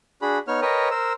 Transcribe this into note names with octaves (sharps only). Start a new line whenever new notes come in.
D4 F#4 G#4 B5
B3 D#4 C#5 F6
A#4 B4 C#5 D#5 G5
A#4 C5 E6